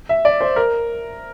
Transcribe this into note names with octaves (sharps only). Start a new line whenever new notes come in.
E5
D5
C5
A#4